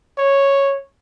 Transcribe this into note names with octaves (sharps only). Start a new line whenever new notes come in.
C#5